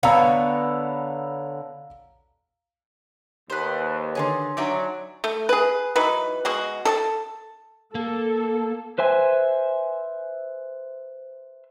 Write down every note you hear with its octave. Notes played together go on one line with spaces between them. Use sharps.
D3 B3 C#5 F5 A#5 E6
D#2 B4 C5
D3 D#3 G#4 C#5 G#5 C6
F#3 D4 D#4 D5 E5
A3
G#4 B4
E3 F#3 D#4 B4
B2 G#3 F#4
A4 D#5 A5
A#3 A4
B4 C5 E5 G#5